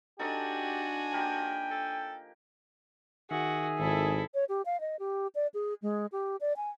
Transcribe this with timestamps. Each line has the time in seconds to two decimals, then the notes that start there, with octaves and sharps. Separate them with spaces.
0.20 D4 D#4 F#4 G4 A4 G#5
1.13 F3 A#3 G4 G5
1.71 A4
3.31 D#3 F#4 G#4 E5
3.78 G#1 E4 A4
4.34 C#5
4.49 G4
4.66 F5
4.81 D#5
4.99 G4
5.35 D5
5.54 G#4
5.82 G#3
6.12 G4
6.41 D5
6.57 G#5